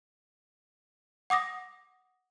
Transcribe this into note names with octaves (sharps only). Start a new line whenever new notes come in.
F#5 D6 D#6 A#6